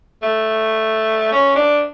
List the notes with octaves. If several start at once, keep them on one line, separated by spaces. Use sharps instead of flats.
A3
C#4
D4